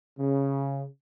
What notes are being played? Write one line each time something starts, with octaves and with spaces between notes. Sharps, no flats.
C#3